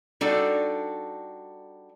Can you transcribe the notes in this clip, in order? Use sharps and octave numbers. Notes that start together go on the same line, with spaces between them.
G3 D4 D#4 F#4 A4 D5